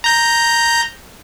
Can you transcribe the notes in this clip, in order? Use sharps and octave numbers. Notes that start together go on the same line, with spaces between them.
A#5 G6 A#6